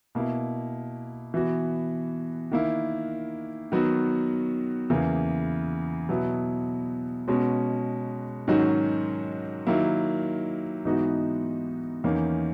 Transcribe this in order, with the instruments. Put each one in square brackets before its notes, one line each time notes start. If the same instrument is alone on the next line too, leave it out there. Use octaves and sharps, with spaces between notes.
[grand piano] B2 A#3 E4
E3 B3 F#4
D#3 A#3 E4
D#3 F#3 B3 F#4
E2 C#3 E3 A#3
B2 F#3 B3 E4
B2 G#3 C#4 F#4
G#2 D#3 F#3 C#4 F#4
D#3 F#3 A#3 E4
G#2 E3 B3 D#4 F#4
E2 D#3 A#3 C#4